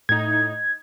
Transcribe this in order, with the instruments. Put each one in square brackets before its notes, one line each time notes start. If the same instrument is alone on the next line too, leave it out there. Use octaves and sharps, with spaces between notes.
[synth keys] A2 D#4 [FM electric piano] G#6